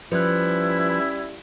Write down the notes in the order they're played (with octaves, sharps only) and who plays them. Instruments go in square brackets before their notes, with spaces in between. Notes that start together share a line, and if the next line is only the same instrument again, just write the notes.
[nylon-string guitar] F3 [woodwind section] G3 C#4 E4 [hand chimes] B4 F#6